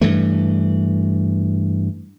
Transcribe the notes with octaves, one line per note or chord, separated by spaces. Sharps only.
G2 E3 A3